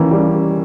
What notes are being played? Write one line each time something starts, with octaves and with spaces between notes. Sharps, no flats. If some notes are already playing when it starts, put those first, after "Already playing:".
Already playing: D#3 E3 A#3 C#4
G3